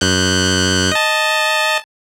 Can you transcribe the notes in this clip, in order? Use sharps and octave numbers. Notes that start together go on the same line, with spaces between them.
F#2 F#6 G6
D#5 A5